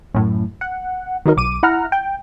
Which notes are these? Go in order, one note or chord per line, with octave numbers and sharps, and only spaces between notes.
F#2 A2
F#5
D#3 F#3 D#4 A#4
B1 D6 D#7
E4 F#5 A#5 F6
G5